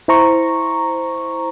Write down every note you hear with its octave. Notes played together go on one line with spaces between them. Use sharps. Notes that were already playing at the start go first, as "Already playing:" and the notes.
E4 C5 A#5 C#6